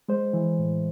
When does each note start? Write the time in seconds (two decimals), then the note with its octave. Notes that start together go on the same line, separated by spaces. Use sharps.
0.09 G#3 C5
0.33 E3
0.59 A2